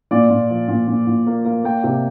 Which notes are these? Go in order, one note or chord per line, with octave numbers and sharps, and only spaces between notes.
A#2 D5
A#2
F3
A#2
A#2
A#2
A#3
A#3
A#3 G5
C3